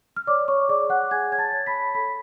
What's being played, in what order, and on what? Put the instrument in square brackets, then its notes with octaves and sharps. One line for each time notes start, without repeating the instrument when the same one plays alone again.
[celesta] F6
C#5 D5 D6
C#5 C#6
G#4 D5 D6
C#5 F#5 F#6
G#4 G#5 G#6
C#5 G#6
A5 A6
C#5
B5 B6
C#5
A4 B5 B6